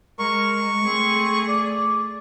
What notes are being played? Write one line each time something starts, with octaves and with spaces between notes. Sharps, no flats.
G#3 A#4 C#6
A3 C4 G#4
D5